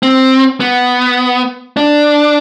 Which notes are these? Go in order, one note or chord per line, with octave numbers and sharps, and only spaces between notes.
C4
B3
D4